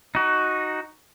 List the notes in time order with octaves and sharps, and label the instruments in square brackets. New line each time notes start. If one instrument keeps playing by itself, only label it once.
[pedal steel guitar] D#4 F#4